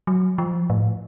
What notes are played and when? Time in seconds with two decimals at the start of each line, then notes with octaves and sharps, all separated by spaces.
0.07 F#3
0.38 F3
0.70 A2